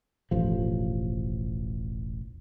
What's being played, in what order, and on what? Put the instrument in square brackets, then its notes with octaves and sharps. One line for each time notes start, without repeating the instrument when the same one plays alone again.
[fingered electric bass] E1 A1 F3